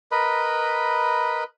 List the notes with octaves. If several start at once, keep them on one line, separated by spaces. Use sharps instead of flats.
A#4 B4 D#5 B5